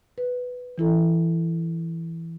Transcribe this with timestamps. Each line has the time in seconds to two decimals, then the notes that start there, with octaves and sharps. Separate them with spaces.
0.18 B4
0.78 E3 E4 A4